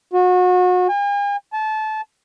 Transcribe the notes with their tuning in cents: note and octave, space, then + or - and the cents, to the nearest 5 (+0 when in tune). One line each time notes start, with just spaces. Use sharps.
F#4 -30
G#5 -45
A5 -25